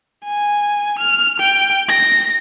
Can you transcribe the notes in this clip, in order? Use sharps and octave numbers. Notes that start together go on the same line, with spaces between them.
G#5
F6
G5
A#6